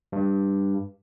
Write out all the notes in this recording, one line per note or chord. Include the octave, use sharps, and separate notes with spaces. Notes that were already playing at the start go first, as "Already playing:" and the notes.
G2